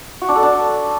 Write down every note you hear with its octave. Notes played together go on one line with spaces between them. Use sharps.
F#4
D4
A4
D4